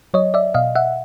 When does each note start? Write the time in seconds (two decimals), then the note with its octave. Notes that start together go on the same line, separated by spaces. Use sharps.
0.14 F#3 C#5 D#5
0.34 D5 E5
0.54 B2 D#5 F5
0.75 E5 F#5